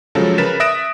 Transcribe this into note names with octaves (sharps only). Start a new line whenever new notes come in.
C#3 F3 F#3 G#3 A4
C#3 A#4 B4 A6 B6 E7
E5 D#6 F#6 A#6 D7 E7